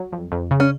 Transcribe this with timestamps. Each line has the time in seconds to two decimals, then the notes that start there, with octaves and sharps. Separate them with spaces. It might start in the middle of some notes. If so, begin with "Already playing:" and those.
Already playing: F#3
0.12 F2
0.32 F2
0.51 C#3
0.60 C#4